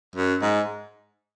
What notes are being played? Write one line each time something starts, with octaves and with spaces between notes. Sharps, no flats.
F#2
G#2